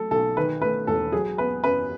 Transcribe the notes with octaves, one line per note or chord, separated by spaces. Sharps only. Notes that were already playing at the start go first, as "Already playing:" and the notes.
Already playing: F#3 A3 A4
B1 A4
D#3 B4
A3 B4
E1 A4
F#3 G#4
B3 B4
F#2 B4